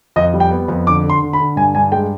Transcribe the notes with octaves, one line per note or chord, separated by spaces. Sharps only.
F2 D#5
G3
G5
B3
F2
D3 D6
D3
C6
D3
B5
D3
G2 G#5
G2 G#5
G#3 G5